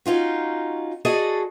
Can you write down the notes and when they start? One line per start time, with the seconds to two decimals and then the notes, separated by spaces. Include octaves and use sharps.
0.06 C#4 D#4 F4 F#4
1.05 F#4 G#4 A4 D5 D#5